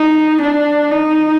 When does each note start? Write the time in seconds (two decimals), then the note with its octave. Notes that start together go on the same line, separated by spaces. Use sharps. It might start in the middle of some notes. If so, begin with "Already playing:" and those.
Already playing: D#4
0.41 D4
0.91 D#4